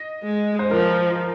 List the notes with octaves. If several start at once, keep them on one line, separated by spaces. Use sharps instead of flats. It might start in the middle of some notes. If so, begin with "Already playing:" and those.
Already playing: D#5
G#3
C5
F3 A#4